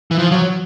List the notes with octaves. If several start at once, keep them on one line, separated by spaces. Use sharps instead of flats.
E3
F3
F#3